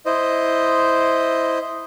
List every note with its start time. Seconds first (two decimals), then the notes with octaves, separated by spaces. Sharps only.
0.06 E4 C5 D#5